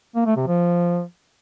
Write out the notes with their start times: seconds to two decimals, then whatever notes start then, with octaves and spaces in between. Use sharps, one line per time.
0.15 A#3
0.26 A3
0.36 C3
0.47 F3